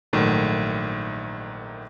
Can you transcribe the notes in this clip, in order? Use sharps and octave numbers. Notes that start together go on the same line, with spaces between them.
A#1 G#2 D#3 F#3 A3